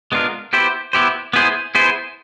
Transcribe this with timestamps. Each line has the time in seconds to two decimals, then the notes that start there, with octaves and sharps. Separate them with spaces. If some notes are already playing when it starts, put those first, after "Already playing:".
0.12 G#3 B3 D4 F4 A#4
0.53 B3 E4 G4 C5
0.93 B3 E4 G4 C5
1.33 B3 E4 G#4 C5
1.75 B3 E4 G#4 C5